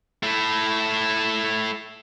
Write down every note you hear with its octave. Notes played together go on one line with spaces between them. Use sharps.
A3 E4